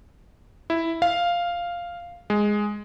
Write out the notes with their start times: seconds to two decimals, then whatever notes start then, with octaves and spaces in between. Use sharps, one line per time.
0.70 E4
1.02 F5
2.30 G#3